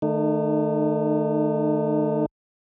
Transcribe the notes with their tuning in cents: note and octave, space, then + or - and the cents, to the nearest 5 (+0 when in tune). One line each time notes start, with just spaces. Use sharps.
D#3 -20 A3 +0 D#4 -40